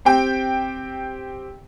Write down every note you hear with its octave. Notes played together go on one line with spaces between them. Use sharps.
C4 G4 G5